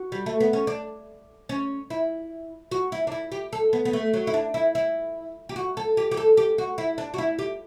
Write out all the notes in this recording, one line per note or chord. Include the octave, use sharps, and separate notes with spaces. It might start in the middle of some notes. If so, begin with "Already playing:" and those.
Already playing: F#4
G3
A3
B3
C#4
D4
C#4
E4
F#4
E4
D4
E4
G4
A4
B3
B3
A3
F#3
E4
D4
E4
E4
G4
F#4
A4
G4
G4
A4
G4
F#4
E4
D4
F#4
E4
G4